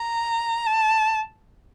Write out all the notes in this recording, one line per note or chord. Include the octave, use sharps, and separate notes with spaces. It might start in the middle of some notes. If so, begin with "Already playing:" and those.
Already playing: A#5
A5